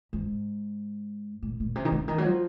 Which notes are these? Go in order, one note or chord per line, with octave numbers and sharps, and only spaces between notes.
G#2
A#2
A#2
C3
D#3
C#3
D#3
F#3
F3